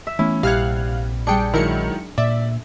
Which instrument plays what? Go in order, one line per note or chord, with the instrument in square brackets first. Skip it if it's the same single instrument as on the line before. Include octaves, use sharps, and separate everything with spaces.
[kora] E5
[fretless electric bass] E3 A3 B3 [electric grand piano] C#4 [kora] E4
[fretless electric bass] A#1 [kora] C3 F#5 [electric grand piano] G3 G#6 [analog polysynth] F5 F6 F#6
[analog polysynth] G3 G5 C#7 [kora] D4 G#4
[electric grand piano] D#3 F#3 G#3 [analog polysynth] E4 A#4 C#7
[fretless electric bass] A#2 [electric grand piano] D5 [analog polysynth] E5